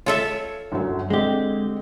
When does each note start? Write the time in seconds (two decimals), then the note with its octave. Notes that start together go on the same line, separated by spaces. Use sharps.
0.06 F4 A4 C#5 E5
0.72 G1 F#2 F#3
1.10 D3 G#3 C4 G4 D#5